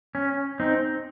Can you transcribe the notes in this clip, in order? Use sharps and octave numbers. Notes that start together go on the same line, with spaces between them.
C#4
C4 D#4